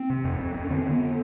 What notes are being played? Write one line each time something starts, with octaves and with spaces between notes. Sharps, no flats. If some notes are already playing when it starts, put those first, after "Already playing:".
Already playing: C4
C3
F2
F2
F2
C#4
D3 C4
D3
B3